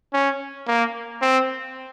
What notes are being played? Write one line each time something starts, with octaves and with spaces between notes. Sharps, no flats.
C#4
A#3
C4